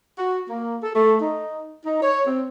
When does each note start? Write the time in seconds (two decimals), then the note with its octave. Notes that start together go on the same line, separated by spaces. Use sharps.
0.18 F#4
0.49 A#3
0.82 A4
0.95 A3
1.21 D#4
1.85 D#4
2.03 C#5
2.26 C4